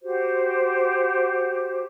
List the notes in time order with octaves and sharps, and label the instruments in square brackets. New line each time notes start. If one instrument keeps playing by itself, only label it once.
[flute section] F#4 G4 C5